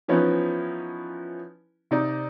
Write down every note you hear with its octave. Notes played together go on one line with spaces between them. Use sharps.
E3 F3 B3 C#4 D#4 E4
C3 D#4 D5